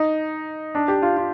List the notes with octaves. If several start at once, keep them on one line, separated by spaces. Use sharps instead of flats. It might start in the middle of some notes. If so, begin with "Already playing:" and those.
Already playing: D#4
D4
G4
F4
F4